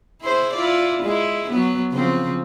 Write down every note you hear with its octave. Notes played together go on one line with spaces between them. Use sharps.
E4 G#4 C5
E4 F4 D5
G#3 E4
F#3 B3
C#3 F3 C4